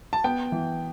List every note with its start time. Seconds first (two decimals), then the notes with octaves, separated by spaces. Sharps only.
0.13 A5
0.24 B3 G5
0.52 E3